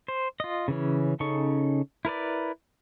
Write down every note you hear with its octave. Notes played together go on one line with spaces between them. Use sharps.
C5
F4 D#5
C#3 E3 C#4
C#3 C#4 D#4 A4 C#6
E4 A#4 B4 D5